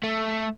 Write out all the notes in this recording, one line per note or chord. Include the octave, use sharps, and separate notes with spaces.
A3